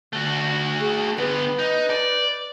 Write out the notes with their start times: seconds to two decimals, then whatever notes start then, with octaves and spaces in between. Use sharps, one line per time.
0.13 D3 A3 F#4
0.79 G#4
1.18 D3 B3 B4
1.59 D#4
1.90 D5